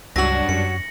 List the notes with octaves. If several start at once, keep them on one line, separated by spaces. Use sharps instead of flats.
C#2 G2 F#3 D4 F#4 A#6 F#7
F#2 C#7